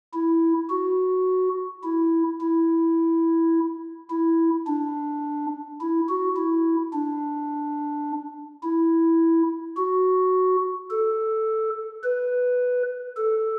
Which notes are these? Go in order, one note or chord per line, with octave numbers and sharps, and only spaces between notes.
E4
F#4
E4
E4
E4
D4
E4
F#4
E4
D4
E4
F#4
A4
B4
A4